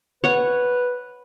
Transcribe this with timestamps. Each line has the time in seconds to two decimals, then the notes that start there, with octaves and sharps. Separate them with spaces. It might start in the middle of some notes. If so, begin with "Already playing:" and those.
0.24 B4 C#5 F#5